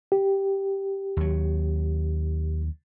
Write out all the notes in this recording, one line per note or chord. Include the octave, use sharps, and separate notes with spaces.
G4
D#2 F#3